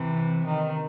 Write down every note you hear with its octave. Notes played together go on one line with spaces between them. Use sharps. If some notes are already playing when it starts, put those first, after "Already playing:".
Already playing: C3 E3
D#3